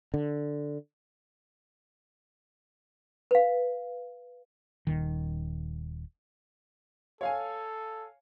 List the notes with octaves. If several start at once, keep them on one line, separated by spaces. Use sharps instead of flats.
D3
B4 F5
D#1 D#3
A4 C#5 F5 G#5